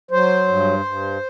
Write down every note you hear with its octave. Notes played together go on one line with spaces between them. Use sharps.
F#3 C5
G2
G2